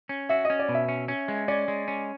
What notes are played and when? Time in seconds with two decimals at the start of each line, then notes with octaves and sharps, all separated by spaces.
0.09 C#4
0.29 F#4 E5
0.45 D#5
0.50 C#4
0.59 D5
0.69 B2
0.74 E5
0.88 C#4
1.08 C#4
1.28 G#3
1.48 C#4 D5
1.68 G#3
1.88 C#4